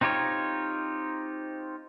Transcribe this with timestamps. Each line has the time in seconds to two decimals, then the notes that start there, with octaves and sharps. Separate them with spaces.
0.01 C4 D#4 F4 G4 C#5